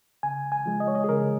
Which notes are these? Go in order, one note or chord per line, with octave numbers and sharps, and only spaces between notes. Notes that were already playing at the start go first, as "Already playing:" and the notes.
C#3 G#5
G#5
F3 G#3
D#5
C#5
D#5
G#4
C#3 A#4